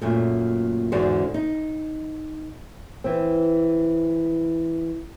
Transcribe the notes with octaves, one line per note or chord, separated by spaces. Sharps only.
F#2 A#2 A3
E2 G#2 D3 D4 F#4 C5
D#4
E3 C4